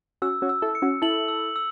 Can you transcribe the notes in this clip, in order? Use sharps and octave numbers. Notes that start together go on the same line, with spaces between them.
C#4 F#4 E6
C#4 F#4
E6
E4 A4
C#7
C#4 F#4
E4 A4 F#7
E6
E6